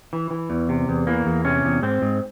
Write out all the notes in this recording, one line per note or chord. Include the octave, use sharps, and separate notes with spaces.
E3
E3
E2
C3
E2
E3 A#3
E2
C3 C#4
E2
G#2 C4
G#2